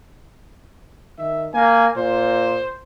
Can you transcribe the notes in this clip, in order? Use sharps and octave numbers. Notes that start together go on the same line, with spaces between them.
D#3 E5
A#3 G#5
A#2 C5